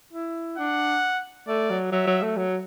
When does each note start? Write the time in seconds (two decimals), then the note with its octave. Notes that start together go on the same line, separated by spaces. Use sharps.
0.13 E4
0.58 D4 F#5
1.47 A3 D5
1.70 F#3
1.92 F#3 E5
2.07 F#3
2.22 A3
2.37 F#3